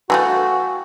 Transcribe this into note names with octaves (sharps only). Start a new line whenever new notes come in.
E3 G#3 A3 F#4 F5 G5 G#5